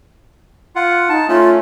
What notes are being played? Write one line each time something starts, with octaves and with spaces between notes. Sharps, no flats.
F4 F#5
D#4 A5
A3 C#4 F4